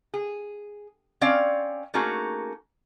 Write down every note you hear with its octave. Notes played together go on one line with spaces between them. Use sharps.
G#4
C4 C#4 D5 F5
A3 A#3 C#4 D#4 F#4 G#4